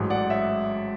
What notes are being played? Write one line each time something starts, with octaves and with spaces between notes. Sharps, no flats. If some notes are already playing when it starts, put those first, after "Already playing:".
Already playing: A1 G#2 F#3
D5 F#5
C#5 E5